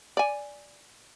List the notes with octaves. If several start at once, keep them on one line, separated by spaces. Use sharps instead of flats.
D5 G#5